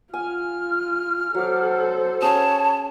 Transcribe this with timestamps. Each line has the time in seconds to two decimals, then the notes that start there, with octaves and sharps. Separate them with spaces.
0.14 F4 G#5 F6
1.35 F#3 A4 C5 D6
2.22 C#4 G#4 C#5 A5